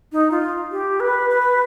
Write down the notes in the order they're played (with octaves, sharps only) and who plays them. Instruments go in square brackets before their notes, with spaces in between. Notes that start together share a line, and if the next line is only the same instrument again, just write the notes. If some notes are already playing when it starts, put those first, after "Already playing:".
[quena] D#4
F4
G4
B4
B4